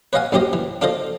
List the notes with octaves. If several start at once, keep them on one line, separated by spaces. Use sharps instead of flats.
B4 C#5 D#5 F5 F#5 G#5
A1 F#2 C#4 G4 C5 D#5
E3
D4 F4 A4 C5 D#5